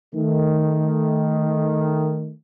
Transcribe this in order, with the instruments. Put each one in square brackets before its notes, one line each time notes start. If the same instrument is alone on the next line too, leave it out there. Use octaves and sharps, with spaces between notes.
[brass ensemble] D#3 A3